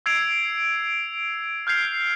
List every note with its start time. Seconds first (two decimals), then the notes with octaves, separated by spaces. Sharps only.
0.06 E6 G#6 C7 D7 F7
1.67 F6 G6 G#6 C7 F7